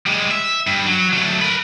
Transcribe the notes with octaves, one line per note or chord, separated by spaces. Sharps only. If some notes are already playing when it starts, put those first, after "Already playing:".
G3 G#3
E5
G2
F#3
F#3 A3
A#4 B4